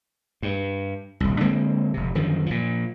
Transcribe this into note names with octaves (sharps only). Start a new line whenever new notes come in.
G2
D#1 C2
D3 G#3 A#3 C4
F1 C3
F#2 D3 D#3 F3
A#2 F3